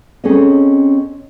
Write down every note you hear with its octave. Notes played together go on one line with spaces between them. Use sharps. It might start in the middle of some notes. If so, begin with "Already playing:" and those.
C4 C#4 G#4 A4 C#5 D#5